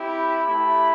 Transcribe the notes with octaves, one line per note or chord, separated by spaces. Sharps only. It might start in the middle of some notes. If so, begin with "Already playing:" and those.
Already playing: C4 E4 G4
B5
A3 E4 G4